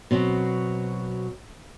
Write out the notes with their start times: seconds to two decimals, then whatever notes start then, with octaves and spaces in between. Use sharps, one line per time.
0.11 B2 F#3 C4